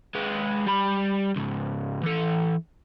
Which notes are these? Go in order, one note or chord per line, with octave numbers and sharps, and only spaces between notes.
G#3 B4
G3 B5
C#2 G#2
E3 A4